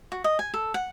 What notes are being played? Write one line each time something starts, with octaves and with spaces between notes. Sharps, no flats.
F#4
D#5
G#5
A4
F#5